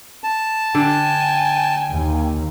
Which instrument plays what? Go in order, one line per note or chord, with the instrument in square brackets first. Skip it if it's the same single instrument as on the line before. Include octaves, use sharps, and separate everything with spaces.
[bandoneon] A5
[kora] D3 [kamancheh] G5 G#5
[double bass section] D#2